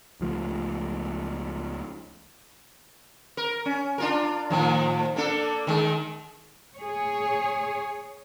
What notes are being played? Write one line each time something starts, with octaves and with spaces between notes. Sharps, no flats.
C#2 F3 A3
A#4
C#4
D4 F4 A#4
A2 D#3 F3
A#3 D4 A4
D#3 G#3
G#4 C#5